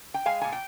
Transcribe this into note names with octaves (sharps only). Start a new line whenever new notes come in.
G5
G#3 F5 G#5
A#2 G#5
G5